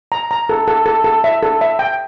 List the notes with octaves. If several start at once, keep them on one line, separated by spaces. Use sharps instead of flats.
A#5
A#5
A4
A4
A4
A4
E5
A4
E5
G5